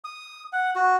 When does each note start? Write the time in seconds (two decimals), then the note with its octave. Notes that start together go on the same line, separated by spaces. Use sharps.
0.04 D#6
0.53 F#5
0.76 F#4